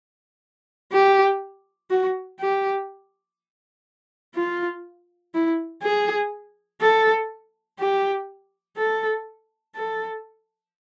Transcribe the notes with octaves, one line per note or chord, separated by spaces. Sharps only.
G4
F#4
G4
F4
E4
G#4
A4
G4
A4
A4